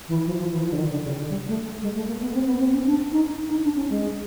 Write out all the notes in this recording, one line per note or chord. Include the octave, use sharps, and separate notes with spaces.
E3
F3
F3
E3
F3
D3
D#3
D3
C#3
D3
G3
A3
G#3
A3
A#3
B3
C4
B3
C4
C#4
D4
D#4
D#4
D4
C#4
G#3